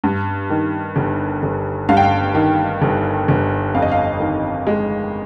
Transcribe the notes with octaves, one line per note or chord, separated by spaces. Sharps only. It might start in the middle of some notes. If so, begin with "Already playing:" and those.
G2
D#3
G1
G1
G2 F5
G5
F5
D#3
G1
G1
F2 F5
D#5
F5
D#3
G#3